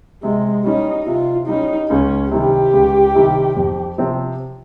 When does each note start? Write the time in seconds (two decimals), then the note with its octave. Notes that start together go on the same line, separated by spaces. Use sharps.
0.23 C3 G#3
0.65 G3 C#4 D#4
1.06 C3 F4
1.48 G3 C#4 D#4
1.90 C#2 C#4
2.31 C3 D#3 G3 G4
2.73 C#2
3.15 C3 D#3 G3
3.57 F2
3.98 C3 F3 C4 G4